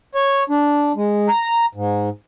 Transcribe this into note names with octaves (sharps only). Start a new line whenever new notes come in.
C#5
D4
G#3
A#5
G#2